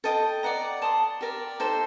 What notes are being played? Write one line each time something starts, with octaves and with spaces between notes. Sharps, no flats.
A4 D#5 G5
D5 F#5 A#5
D5 A5 C6 D#6
G4 A#4 D5
D#4 A4 C5